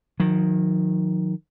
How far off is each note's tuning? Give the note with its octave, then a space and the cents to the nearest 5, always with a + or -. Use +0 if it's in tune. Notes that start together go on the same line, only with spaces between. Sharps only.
D#3 +0 F#3 -40